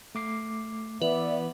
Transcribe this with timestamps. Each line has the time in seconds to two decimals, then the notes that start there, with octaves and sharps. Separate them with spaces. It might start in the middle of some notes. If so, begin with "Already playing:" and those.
0.15 A3 D6 C7
1.02 E3 B3 B4 D5 E5